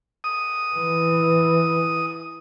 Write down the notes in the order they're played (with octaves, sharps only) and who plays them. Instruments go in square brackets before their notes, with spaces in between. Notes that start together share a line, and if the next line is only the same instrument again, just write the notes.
[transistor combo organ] D#6
[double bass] E3